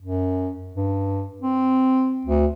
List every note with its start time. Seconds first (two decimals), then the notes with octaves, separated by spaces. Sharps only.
0.02 F#2
0.75 G2
1.42 C4
2.25 D2